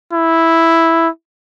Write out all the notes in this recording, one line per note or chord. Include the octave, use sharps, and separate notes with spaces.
E4